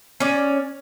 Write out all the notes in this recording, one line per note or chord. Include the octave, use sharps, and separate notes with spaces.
C#4 D5